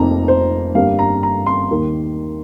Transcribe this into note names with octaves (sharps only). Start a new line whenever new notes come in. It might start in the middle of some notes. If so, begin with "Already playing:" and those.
Already playing: F1 F2 F3 A#3 D#4 A#5
C5
G1 G2 G3 A#3 F5
A#5
A#5
C6
D#2 D#3 A#3